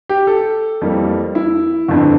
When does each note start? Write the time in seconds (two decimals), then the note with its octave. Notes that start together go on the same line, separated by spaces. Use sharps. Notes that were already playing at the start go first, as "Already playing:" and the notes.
0.09 G4
0.27 A4
0.81 F2 E3 G3 A#3
1.35 E4
1.88 G1 F2 D3